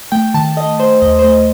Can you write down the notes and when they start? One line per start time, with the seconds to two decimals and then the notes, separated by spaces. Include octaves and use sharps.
0.12 A3 G5
0.34 D#3 A5
0.57 A3 D#5
0.80 A3 C5
1.02 D#2 D#5
1.19 C5
1.24 A3 D#5